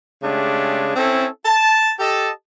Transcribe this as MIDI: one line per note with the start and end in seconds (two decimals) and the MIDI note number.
0.23 0.91 49
0.23 0.91 56
0.23 0.91 57
0.23 0.91 62
0.23 0.91 67
0.96 1.28 60
0.96 1.28 61
0.96 1.28 64
0.96 1.28 69
1.46 1.93 81
1.99 2.30 67
1.99 2.30 69
1.99 2.30 75
1.99 2.30 81